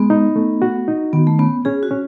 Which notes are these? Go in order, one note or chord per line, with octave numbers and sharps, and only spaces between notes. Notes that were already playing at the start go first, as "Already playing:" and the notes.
Already playing: G#3 B3
D#4
A3
F#4
D#4
D#3 B3
A3
B3 C#4
C#4 G#4
F#4
C#4